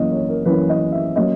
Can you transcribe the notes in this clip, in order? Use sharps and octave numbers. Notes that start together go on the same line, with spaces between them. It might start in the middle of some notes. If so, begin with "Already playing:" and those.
Already playing: F#2 E3 A#3 C#4 D#5
C#5
A#4
F#2 E3 A#3 C#4 B4
D#5
E5
F#3 A#3 C#4 D#5